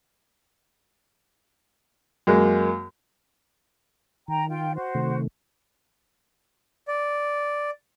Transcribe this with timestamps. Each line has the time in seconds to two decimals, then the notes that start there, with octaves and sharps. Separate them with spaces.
2.27 F#2 G#3 A#3
4.28 D#3 G5 A#5
4.49 F4 G5
4.75 F#4 C5
4.95 C3 D#3 A3
6.88 D5